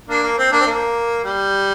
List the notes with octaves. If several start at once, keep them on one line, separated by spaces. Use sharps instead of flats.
A#3 D4
A#3
C4
A#3 D4
C4
A#3
G3